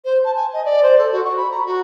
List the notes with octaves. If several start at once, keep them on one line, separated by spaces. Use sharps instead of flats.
C5
A5
G#5
D#5
D5
C5
A4
F#4
C#6
B5
A#5
F#4